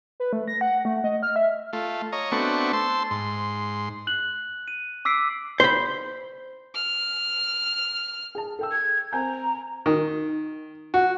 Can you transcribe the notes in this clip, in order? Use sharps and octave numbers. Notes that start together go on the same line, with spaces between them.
B4
A3
A#6
F#5
A3
D#5
F6
E5
A3 F4
C#5 D#5 A#5
A3 B3 C4 D4 F#4 C#6
C5 A5 C6 E6
G#2 C6
F#6 F#7
D#7
D6 E6 B6 C7 D7
C5 B5
F6
G#4 A5
A4 G5 E6
G#6
C4 G#5 A#5 G6
D#3
F#4